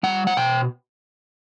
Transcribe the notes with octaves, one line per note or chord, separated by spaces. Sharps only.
G3 F#5
F#5
B2 G5